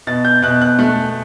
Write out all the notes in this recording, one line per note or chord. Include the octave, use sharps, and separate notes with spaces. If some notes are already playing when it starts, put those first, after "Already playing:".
B2 A6
G6
B2 F#6
F#6
A3 F#6